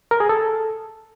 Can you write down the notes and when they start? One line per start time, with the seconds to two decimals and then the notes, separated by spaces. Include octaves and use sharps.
0.11 A#4
0.20 G#4
0.29 A4